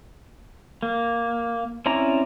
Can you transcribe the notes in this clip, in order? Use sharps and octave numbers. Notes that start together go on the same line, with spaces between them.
A#3
C4 C#4 E4 D5 A#5